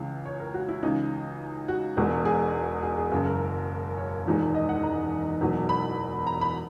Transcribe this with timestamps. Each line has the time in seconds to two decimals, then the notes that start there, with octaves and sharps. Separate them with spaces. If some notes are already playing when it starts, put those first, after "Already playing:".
Already playing: C#2 C#3 E3
0.25 C#5
0.40 A#4
0.54 F#4
0.68 E4
0.83 C#2 C#3 E3 D#4
1.68 F#4
1.97 E1 E2 B2 G#3
2.25 G#4
2.83 G#4
2.97 G#4
3.12 F#1 F#2 C#3 G#4
3.26 A#4
3.97 C#5
4.26 E1 E2 D#3 G#3
4.55 D#5
4.69 F#5
4.83 A#5
5.41 E1 E2 B2 F#3
5.69 B5
6.27 A#5
6.41 B5